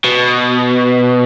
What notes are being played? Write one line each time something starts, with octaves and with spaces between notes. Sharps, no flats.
B2